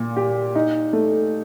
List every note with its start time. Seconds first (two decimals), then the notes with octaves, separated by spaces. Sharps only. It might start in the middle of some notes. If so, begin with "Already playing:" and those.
Already playing: A#2
0.17 G4
0.55 D#4
0.93 A3